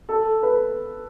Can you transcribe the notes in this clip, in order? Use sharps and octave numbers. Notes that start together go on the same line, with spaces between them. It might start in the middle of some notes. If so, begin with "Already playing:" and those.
A4
B4